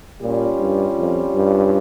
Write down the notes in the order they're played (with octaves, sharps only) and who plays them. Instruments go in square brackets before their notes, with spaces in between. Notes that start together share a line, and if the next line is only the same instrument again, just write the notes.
[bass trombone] A#2 [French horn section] G3 C#4 F4
[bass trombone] G2
F2
G2